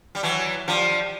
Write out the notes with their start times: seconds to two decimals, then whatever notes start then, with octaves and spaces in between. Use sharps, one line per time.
0.15 G3
0.23 E3 F#3
0.68 F3 G3